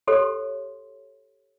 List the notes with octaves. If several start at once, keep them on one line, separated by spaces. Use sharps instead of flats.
G4 A4 C#5 C6